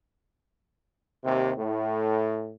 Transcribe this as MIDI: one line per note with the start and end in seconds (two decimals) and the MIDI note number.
1.24 1.53 39
1.24 1.53 48
1.57 2.52 45